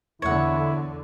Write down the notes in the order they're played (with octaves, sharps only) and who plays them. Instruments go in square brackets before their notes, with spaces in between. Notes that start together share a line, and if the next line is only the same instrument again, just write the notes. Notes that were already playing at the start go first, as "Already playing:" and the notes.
[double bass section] E2 D3 [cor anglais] E4 [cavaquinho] C#5 F#5